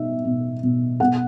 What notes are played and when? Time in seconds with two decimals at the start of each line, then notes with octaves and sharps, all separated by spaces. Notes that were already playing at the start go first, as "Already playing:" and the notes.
Already playing: B2 D#4 E5
0.25 B2
0.63 B2
1.00 B2 F#5